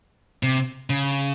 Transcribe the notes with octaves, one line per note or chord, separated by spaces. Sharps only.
C3
C#3